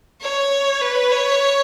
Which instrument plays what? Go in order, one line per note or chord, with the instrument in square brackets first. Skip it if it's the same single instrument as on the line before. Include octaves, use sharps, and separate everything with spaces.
[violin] C#5
B4
C#5